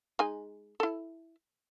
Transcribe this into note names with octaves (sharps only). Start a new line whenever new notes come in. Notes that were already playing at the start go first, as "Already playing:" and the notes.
G#3 D#4 G#5
E4 A4